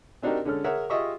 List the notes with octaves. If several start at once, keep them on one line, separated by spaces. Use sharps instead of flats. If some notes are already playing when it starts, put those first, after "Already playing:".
C4 D4 D#4 F#4 G4 A#4
D3 G#3 C#4 A4 F6
G#4 A#4 C#5 E5 F#5
F4 G4 G#4 D#5 E5 C#6